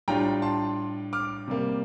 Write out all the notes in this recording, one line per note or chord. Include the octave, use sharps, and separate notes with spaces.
A2 G3 D4 F4 G5 A#5
A5 C6
D6 F6
C3 G3 A#3